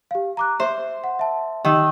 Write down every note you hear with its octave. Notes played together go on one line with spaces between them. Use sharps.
G4 F5
A#5 D6 F#6
C5 E5
F#5
E5 A5
D#3 G4 E6